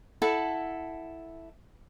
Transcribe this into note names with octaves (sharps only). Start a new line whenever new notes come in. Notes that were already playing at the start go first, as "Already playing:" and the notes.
E4 A4 F#5 A5